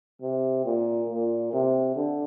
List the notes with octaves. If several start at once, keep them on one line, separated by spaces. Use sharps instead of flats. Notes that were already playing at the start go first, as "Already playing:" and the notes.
C3
A#2
A#2
C3
D3